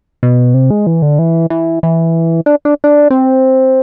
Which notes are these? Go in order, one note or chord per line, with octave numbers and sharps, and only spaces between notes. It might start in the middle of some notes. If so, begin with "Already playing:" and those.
B2
C3
G#3
E3
D3
E3
E3
E3
D4
D4
D4
C4